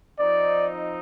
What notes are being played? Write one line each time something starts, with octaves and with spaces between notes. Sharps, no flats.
F3 C4 D#4 D5